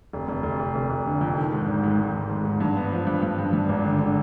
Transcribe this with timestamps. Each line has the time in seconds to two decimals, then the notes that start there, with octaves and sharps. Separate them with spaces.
0.13 F1
0.29 F1
0.43 F1
0.59 F1
0.75 F1
0.90 F1
1.06 D3
1.21 F2
1.37 D#3
1.52 G#2
1.68 G#1
1.83 G#2
1.99 G#2
2.15 G#1
2.30 G#2
2.45 G#2
2.60 G2
2.77 B3
2.92 F3
3.07 G2
3.22 G2
3.39 G2
3.53 G2
3.69 G#1
3.84 D3
4.00 D3